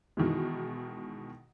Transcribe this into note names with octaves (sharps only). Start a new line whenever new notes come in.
B2 D#3 E3 G#3